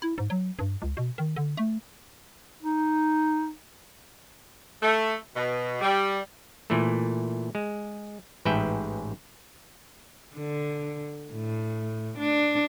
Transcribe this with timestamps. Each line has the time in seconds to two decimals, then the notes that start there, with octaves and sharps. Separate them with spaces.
0.02 E4
0.18 G#2
0.30 F#3
0.59 G2
0.82 C#2
0.97 B2
1.18 D#3
1.36 D3
1.57 A3
2.62 D#4
4.82 A3
5.35 B2
5.81 G3
6.70 A#2 E3 A3
7.55 G#3
8.45 A1 G#2 B4 E5 G5
10.36 D3
11.33 A2
12.18 D4